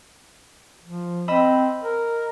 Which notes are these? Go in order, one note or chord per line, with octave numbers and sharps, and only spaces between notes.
F3
C4 D#5 B5 E6
A#4